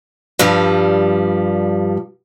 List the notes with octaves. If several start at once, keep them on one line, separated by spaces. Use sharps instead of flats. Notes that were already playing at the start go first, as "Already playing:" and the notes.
G2 F3 G3